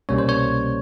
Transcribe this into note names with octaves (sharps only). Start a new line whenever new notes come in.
C2 B2 G3 A#3 C#4 C#5
C5
C#5